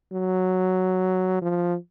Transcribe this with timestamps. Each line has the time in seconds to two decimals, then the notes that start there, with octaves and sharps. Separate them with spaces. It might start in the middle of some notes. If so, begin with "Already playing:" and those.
0.12 F#3
1.42 F3